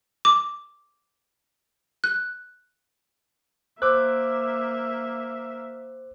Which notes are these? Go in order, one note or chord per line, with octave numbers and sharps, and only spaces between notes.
D6
F#6
A#3 C5 E5 D6 E6 F#6